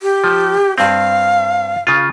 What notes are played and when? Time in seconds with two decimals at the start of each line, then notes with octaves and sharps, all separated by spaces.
0.02 G4
0.24 F3
0.78 G2 C4 F5
1.87 C#3 F4